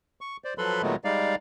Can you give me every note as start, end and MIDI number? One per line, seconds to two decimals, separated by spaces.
0.21 0.37 85
0.44 0.54 72
0.44 0.54 74
0.58 0.82 53
0.58 0.82 54
0.58 0.82 69
0.58 0.82 71
0.58 0.82 83
0.58 0.82 84
0.82 0.96 46
0.82 0.96 51
0.82 0.96 54
0.82 0.96 56
0.82 0.96 57
0.82 0.96 59
1.04 1.35 55
1.04 1.35 56
1.04 1.35 63
1.04 1.35 74
1.04 1.35 77